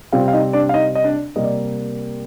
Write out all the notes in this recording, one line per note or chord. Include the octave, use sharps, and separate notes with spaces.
C3 G3 C4 F4 F5
F5
D#4 D#5
D4 D5
F5
D#4 D#5
D#5
D4 D5
C3 G3 A#3 D#5
D5